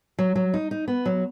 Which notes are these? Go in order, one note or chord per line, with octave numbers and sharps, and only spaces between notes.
F#3
F#3
D#4
D#4
B3
F#3